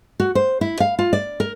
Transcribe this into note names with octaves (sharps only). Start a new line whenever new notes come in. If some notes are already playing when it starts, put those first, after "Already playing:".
F#4
C5
E4
F5
F4
D5
A#4